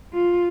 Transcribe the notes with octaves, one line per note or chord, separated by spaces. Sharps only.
F4